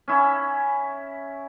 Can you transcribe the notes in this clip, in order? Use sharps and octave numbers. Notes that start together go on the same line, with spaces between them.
C#4 E4